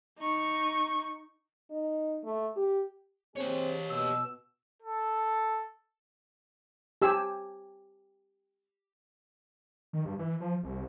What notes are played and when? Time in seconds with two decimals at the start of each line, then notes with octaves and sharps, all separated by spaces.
0.19 D#4 C#6
1.70 D#4
2.23 A3
2.56 G4
3.36 C4 G4 G#4 C#5
3.90 B2 E6
4.82 A4
7.02 G4 G#5 E6
9.93 D#3
10.05 G2
10.19 E3
10.40 F3
10.63 C2